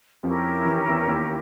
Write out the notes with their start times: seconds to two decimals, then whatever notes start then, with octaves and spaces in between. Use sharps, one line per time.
0.23 F2 F3 C#4 E4 G4 A#4
0.65 E3
0.77 D#3
0.89 E2 E3
1.07 D#2 D#3